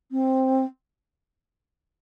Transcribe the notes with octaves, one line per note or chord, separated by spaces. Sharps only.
C4